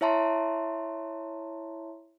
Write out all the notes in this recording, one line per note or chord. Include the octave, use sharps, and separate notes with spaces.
E4 C#5 E5 A5 A#5 C6